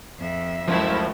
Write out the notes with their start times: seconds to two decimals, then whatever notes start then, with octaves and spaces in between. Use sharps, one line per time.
0.18 F2 E5
0.68 F#1 C#2 F3 A3 E4